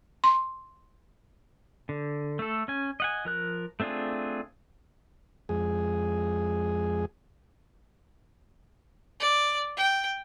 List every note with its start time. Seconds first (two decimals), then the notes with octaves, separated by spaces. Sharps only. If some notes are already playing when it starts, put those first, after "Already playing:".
0.24 C6
1.89 D3
2.39 A3 A4
2.68 C#4 G#5
3.00 D#5 F#5 G#5
3.25 F3 A#4 F#6
3.80 A3 C4 D4 F4 G#4
5.49 F2 G#3 G#4
9.20 D5
9.77 G5